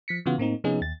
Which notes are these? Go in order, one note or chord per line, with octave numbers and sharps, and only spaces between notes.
F3 B6 C#7
C#3 E3 B3 F4 F#4
A2 A#3 C4 D#4
C3 F3 B3 C#4 D#4 G#4
D#2 A6